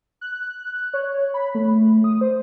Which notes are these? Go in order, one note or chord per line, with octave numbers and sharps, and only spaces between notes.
F#6
C#5
B5
A3
D#6
C5